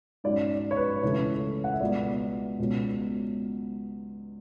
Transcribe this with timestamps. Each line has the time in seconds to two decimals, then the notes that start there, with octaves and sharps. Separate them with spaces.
0.24 G#2 F#3 C#4 D5
0.71 C#5
0.77 B4
1.03 C#2 C#3 E3 A3 C#4 C#5
1.64 F#5
1.73 E5
1.81 C#2 B2 F#3 B3 D5
2.59 C#2 B2 F#3 C#4